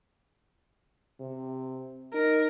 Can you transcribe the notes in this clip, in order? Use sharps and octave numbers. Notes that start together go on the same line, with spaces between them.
C3
D#4 A#4